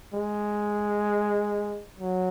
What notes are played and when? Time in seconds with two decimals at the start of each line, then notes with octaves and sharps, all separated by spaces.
0.13 G#3
1.99 F#3